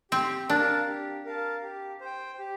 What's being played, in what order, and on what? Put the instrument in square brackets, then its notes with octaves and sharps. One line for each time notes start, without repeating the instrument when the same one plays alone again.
[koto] C4 [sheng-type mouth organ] G4
[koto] D4 [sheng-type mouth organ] A#4 F5 A5
[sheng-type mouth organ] G4
A#4 F5 A5
G4
C5 G5
G4